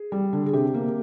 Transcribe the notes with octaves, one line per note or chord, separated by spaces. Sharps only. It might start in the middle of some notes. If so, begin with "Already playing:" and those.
Already playing: G#4
G3
D3
G#4
C3 G4
A#3